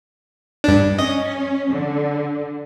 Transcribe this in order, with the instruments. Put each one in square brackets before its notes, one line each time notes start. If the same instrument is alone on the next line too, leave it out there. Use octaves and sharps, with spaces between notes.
[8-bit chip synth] G2 D4
[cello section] C#4 [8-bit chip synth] D#5
[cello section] D3